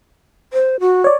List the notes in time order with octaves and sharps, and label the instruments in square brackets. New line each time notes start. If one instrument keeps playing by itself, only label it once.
[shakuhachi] C5
F#4
[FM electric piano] C#5 D5